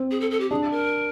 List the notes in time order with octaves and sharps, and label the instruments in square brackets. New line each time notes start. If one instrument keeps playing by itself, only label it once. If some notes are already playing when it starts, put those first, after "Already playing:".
Already playing: [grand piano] C4
[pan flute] G#4
A4
A4
G4
[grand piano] D4 [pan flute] G#4
[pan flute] A#4